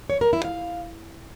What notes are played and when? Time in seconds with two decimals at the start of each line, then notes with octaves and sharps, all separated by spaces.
0.10 C#5
0.21 A#4
0.33 E4
0.45 F5